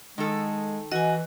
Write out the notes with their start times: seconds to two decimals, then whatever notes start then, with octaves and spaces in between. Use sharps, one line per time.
0.18 D#3 G#3 A4
0.92 E3 F#4 D#5 G#5